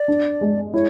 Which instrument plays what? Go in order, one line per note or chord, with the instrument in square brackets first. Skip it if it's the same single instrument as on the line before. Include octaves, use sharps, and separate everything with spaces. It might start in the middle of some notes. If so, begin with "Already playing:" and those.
Already playing: [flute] D5
[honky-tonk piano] D4
G#3
[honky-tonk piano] E4 [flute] C#5